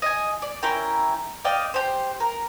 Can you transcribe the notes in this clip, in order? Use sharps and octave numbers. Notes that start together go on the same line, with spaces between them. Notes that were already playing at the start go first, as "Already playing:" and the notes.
D#5 G#5
D5
C#4 E4 A#4 G5
D5 D#5 F5 G5
G4 C5
A#4